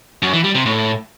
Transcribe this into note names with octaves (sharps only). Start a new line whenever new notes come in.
F#2
E3
G3
C3
A2